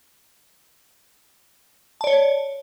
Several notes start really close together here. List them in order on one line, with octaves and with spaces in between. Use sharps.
A5 D5 C#5